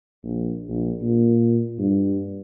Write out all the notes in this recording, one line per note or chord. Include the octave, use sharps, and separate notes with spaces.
A#1
A#1
A#2
G2